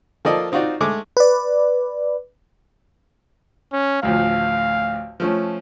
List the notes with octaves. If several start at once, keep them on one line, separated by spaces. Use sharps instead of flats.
F3 A#3 F4 A4 D5 D#5
C4 D#4 F4 F#4 D5
G#3 A3 D6
B4 D5
C#4
A1 D2 F3 F5
F3 A3 C#4